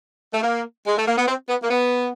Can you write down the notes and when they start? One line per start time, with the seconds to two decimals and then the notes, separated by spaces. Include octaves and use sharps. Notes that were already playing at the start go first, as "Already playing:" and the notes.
0.33 A3
0.43 A#3
0.87 G#3
0.98 A3
1.07 A#3
1.18 B3
1.27 C4
1.49 B3
1.63 A#3
1.70 B3